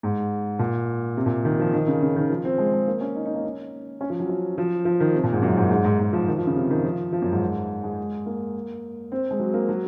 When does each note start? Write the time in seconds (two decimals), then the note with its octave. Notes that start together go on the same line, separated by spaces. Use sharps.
0.03 G#2
0.59 A#2
1.17 C3
1.26 A#2
1.45 D#3
1.60 F3
1.74 D#3
1.88 C#3
2.02 C#3
2.16 D#3
2.30 F3
2.45 C4
2.58 G#3
2.73 G#3
2.87 A#3
3.01 C#4
3.15 D#4
3.25 D#4
3.34 A#3
3.44 C#4
4.01 C#4
4.10 F3
4.20 F#3
4.29 C#4
4.58 F3
4.85 F3
5.00 D#3
5.14 C3
5.23 A#2
5.33 G#2
5.42 F#2
5.57 G#2
5.70 G#2
5.84 G#2
5.99 G#2
6.13 F3
6.28 D#3
6.37 F3
6.47 C#3
6.56 C3
6.71 D#3
6.84 F3
7.13 F3
7.22 F#2
7.32 G#2
7.84 G#3
8.26 A#3
9.12 C4
9.31 G#3
9.39 F#3
9.54 A#3
9.69 F#3